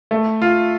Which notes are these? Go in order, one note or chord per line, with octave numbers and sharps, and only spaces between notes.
A3
F4